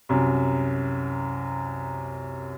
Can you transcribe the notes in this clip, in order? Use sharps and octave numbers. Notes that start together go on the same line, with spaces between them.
C2 F#2